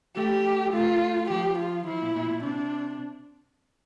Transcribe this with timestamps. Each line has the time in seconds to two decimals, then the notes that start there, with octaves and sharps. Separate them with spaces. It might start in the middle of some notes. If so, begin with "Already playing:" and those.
0.16 A3 G4
0.73 A3 F4
1.30 F3 G4
1.59 F4
1.87 F3 E4
2.02 A#2
2.16 A#2
2.30 A#2
2.44 C3 D4